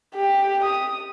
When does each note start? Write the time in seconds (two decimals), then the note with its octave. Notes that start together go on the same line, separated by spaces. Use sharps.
0.15 G4
0.64 D#6